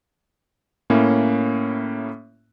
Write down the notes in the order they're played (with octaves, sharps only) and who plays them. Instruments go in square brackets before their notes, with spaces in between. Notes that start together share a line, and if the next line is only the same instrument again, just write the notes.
[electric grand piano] A2 A#3 C#4 E4